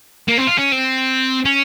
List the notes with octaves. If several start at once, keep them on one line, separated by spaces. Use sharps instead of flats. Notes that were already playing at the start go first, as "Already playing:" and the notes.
A#3
C4
F4
C#4
C4
C#4